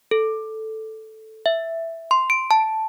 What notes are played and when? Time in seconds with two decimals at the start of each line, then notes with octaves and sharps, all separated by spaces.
0.11 A4
1.46 E5
2.11 C6
2.30 D7
2.51 A5